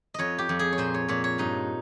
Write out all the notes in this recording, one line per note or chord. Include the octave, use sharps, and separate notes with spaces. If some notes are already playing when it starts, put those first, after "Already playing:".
F2 C#5 D#5
G4
F2
G#4
C#5
A#2 C5
C#5
A#2 C#5
C#5
G2 D#4